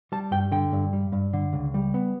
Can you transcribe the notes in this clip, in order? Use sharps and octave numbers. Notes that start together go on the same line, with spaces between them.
G3 A5
G2 G5
D3 G5
G2
G3
G2
D3
C#2
G3
B3